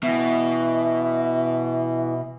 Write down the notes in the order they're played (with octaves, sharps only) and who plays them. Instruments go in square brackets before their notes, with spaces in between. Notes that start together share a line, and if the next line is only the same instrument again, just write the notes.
[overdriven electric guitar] B2 [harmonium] E3 [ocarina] E5